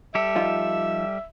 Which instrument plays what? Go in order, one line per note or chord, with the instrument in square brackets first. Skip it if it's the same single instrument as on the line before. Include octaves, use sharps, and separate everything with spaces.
[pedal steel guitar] G3 G4 A4 [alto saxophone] E5
[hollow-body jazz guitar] F3 D#4 F4